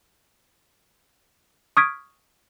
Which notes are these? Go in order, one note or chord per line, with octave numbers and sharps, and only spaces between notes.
C#6 D#6 F6 G#6 B6 D7